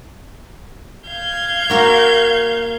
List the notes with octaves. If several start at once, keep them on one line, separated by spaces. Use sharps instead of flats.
F5 G6 G#6
A#3 F#4 A#4